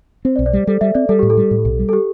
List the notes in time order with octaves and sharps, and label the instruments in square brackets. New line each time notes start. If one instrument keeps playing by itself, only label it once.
[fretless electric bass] C4 [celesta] C5
[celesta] D5
[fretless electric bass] B1
[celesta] D5
[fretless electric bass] G3
[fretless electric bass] G3 [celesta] A4
[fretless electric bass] G3 [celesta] E5
[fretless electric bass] C4 [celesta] D5
[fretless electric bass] G3 [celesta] A4
[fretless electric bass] A2 [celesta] G4
[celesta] A4
[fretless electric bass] G3
A2
B1
G3
[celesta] A4
G4